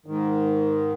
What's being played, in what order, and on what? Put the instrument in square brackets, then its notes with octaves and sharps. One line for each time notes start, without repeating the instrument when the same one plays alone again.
[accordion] G#2 D#3